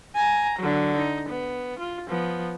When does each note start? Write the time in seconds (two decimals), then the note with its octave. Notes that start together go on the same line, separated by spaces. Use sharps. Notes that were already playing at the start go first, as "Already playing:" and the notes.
0.15 G#5 A#5
0.59 D3 F#3
0.97 D#4
1.29 B3
1.79 F4
2.09 F3 B3